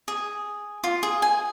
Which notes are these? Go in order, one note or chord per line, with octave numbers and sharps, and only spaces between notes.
G#4
F4
G#4
G#5